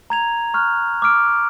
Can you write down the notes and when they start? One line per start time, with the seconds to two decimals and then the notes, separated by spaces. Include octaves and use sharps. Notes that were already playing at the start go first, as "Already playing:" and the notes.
0.10 A#5 G#6 F7
0.54 C#6 F6 F#6
1.02 D6 E6 F6 D7